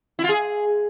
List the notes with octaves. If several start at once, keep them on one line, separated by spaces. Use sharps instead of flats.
E4
F4
G#4